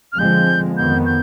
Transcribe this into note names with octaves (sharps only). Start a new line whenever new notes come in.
F6
D3 F3 G#3 C4 G6
F2 D#3 B3 G6
G6